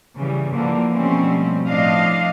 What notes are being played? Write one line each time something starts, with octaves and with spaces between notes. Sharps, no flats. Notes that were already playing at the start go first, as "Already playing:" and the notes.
C#3 E3 G3
D3 E3 F3 A#3
B2 F3 G3 A3 C4 C#4
A2 F3 D4 D#5 F5